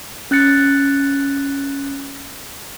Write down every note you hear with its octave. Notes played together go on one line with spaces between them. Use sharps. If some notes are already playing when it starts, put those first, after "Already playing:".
C#4 F#6 A6 C#7